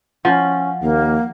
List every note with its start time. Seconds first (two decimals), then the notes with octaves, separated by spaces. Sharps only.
0.25 F3 C#4 F#5
0.82 D#2 A#3